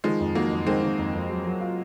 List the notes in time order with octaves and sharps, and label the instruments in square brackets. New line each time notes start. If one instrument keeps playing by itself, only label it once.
[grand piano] D#3 [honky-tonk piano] F3 G#3
[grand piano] F2
[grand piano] D#3 [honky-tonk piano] F#3 A#3
[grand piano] F2
[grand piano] D#3 [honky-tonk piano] G#3 C4
[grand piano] D#3
F2
F2
F#3
F#3
F4